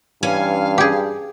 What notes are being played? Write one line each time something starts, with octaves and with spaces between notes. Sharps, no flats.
G2 E3 C#4 F5 G#5
G4 G#4